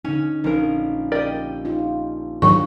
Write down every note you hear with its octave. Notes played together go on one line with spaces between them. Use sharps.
D3 C#4 D#4
A#1 D#4 A#4
G4 A#4 D5 D#5
D#4 F4
G#2 D#3 F#3 D4 F4 C#6